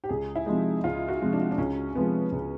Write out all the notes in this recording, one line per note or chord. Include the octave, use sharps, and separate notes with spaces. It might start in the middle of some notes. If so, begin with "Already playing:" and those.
G4
C#2 G#4
E4
C3 F3 G#3 D#4
C#2 F4
F#4
C3 F3 G#3
D4
D4
C#2 C#4
C3 F3 G#3 B3
C#2